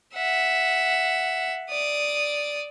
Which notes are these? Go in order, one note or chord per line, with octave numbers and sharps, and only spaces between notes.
E5 F#5
D5 D#6